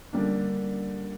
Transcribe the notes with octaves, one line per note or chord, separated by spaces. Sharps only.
D3 G3 A#3 D4